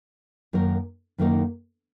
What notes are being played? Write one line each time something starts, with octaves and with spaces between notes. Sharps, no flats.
F#2 D#3 A#3 D#4 A#4
F#2 D#3 A#3 D#4 A#4